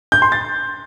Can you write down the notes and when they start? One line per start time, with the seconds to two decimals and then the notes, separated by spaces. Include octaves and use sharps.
0.12 G6
0.22 C6
0.32 A6